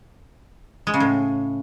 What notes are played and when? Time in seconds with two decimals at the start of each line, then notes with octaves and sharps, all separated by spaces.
0.87 G#3
0.94 C#3
1.00 A2